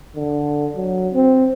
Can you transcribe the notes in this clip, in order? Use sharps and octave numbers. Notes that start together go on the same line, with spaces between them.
D3
F#3
C4